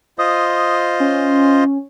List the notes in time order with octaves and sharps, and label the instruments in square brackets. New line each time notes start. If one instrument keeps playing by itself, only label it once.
[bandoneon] F4 C5 D#5 [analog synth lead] D#6
[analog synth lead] C#4